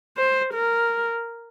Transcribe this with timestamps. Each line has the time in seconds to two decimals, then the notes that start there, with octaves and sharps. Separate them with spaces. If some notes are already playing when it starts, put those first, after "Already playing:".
0.17 C5
0.53 A#4